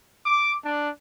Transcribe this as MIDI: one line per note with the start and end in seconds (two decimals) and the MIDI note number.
0.25 0.55 86
0.63 0.88 62